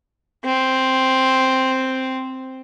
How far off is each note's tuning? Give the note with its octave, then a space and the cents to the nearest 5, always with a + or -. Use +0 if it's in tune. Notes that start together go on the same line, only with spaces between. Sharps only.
C4 +0